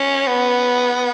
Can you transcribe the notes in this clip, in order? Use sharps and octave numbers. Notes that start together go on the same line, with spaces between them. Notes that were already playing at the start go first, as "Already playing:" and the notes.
Already playing: C#4
B3